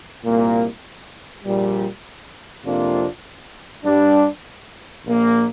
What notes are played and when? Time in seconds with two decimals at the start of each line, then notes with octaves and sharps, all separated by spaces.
0.25 C2 A#2 A#3
1.45 A#1 A#2 G3
2.65 F2 C3 A#3 D4 F4
3.85 G2 G3 D4
5.05 A#1 A#2 A#3